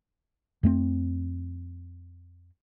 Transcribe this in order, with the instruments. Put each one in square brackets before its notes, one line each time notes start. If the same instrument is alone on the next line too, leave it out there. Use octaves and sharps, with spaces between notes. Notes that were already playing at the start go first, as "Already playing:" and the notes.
[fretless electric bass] F2 A3 C4